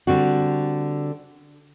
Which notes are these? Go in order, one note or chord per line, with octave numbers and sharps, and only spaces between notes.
D3 G3 C4 F#4